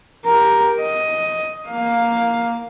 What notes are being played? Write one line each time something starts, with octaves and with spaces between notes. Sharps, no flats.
G4 A#4
D#5
A#3 F5